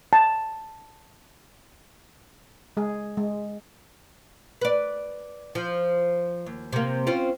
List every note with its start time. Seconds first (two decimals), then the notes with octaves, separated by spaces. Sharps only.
0.13 A5
2.77 G#3 G#4
3.17 G#3
4.61 B4 D5
5.55 F3
6.46 D#2
6.72 C3 A#3
7.07 C4 C#4 F4